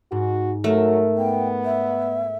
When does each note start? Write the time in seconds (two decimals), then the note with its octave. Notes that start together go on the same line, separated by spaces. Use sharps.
0.12 G#2 F#4
0.64 F#3 A3 A#4
1.18 B3 G5
1.64 E5